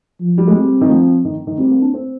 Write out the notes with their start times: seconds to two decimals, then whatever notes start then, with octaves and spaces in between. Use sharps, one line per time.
0.20 F3
0.38 G3
0.47 G#3
0.55 G3 C4
0.81 D#3
0.89 F3
1.25 D#3
1.47 D#3
1.58 G3 C4
1.70 A#3
1.81 D4
1.94 C4